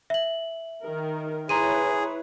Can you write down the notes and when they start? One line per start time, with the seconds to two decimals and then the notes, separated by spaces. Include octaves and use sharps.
0.10 E5 F#7
0.82 D#3 A#4
1.49 E4 G#4 B4 C#5 A#5 C6 D#7